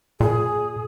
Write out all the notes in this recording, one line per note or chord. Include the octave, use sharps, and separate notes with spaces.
A#2 G#4